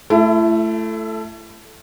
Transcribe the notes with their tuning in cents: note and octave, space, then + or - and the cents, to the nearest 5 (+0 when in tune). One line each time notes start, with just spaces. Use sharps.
A3 +0 E4 +35